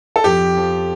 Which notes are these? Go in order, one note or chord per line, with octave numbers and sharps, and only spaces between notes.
A4
F2 G4
F3